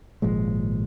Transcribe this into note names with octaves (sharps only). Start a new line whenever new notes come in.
G#1 A#2 F3 G#3